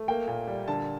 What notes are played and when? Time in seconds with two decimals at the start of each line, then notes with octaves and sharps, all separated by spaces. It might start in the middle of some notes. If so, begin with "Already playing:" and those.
Already playing: A3
0.08 A#3 G5
0.27 A#2
0.47 G3
0.68 D3 A5